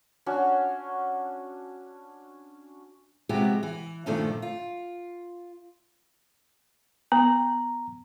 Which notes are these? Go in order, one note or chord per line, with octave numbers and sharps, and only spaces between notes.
C#4 D4 F#4
C3 F3 G#3 B3 F#4 G4
E3
G2 A#2 D3 D#3 F3 A3
F4
B3 A#5